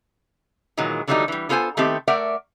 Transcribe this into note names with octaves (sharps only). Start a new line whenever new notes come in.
A#2 D#3 E3 F#3 G#3
D3 E3 F#3 G3 A3 D#4
E3 G3
B3 F4 A4 C5 G5 G#5
D#3 A3 B3 C4 G4
A3 A#4 D5 E5 F#5